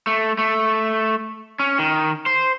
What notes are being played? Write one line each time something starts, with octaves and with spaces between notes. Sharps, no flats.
A3
A3
C#4
D#3
C5